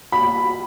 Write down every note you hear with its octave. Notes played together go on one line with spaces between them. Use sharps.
B5